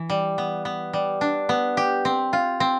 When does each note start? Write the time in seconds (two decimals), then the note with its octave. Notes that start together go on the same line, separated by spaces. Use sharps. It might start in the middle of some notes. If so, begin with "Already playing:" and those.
Already playing: E3
0.10 G3
0.38 B3
0.65 B3
0.93 G3
1.21 D4
1.49 B3
1.77 G4
2.05 C4
2.33 F4
2.60 C4